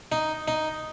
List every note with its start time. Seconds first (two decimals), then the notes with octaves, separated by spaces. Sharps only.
0.12 D#4
0.48 D#4